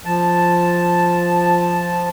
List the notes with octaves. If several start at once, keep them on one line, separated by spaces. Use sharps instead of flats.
F3 A5